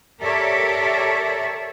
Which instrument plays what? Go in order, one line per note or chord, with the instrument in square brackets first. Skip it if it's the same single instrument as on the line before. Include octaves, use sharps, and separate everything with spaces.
[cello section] G4 A4 A#4 C#5 D5 E5